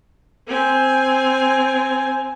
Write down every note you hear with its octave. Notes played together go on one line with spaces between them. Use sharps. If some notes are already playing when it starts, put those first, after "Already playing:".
C4 G#5